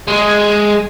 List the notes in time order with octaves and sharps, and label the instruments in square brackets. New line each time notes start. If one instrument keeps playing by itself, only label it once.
[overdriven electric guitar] G#3